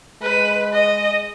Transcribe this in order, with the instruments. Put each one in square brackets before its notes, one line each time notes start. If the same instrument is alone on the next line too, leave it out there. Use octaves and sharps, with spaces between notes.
[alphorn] G#3 [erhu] B4
[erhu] D#5